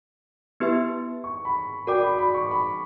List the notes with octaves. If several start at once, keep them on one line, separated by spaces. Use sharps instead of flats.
B3 E4 G4 B4 E5
C#6
B5
F#4 A#4 D5 G5 D6
B5
B5
C#6
B5